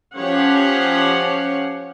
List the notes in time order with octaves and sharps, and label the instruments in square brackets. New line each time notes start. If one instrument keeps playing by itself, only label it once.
[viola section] F3 C#4 G4 C#5 F5 F#5